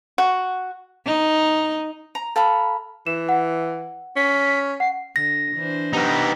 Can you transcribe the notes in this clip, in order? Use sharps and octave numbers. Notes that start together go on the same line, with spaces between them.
F#4
D#4
A#5
A4 F5 A#5 B5
E3 E7
F#5
C#4 B6
F#5 C7
D3 A#6
E3 D4 C5
B3 D#4 G4 B4